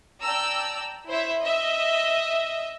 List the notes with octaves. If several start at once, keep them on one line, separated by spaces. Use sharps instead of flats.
D5 G5 A5 A#5 E6
E4 C5 C#5 E5
D#5 E5